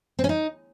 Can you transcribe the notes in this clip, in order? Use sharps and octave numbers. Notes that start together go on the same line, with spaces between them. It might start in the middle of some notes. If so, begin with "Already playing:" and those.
C4
C#4
D#4